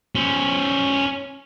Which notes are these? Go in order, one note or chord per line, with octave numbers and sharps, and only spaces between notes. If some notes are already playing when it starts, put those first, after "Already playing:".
C#4 C5